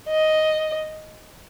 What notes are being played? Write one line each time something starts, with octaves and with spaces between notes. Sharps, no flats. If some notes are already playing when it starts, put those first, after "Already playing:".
D#5